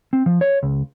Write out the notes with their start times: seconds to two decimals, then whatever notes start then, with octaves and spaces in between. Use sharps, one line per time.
0.13 C4
0.26 F3
0.41 C#5
0.63 C#2